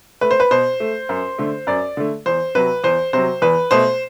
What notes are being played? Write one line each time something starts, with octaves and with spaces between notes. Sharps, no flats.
A3 B4
C5
B4
B2 C5
A3
F#2
D3 A3
F#2 D5
D3 A3
E2 C5
C3 F#3 B4
E2 C5
C3 F#3 C5
E2 B4
B2 A3 C5